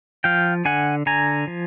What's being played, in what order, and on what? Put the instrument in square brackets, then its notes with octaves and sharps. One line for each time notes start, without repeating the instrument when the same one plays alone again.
[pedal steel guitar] F3 F5 G5
D3 F#5 G#5
D3 G#5 A#5
F3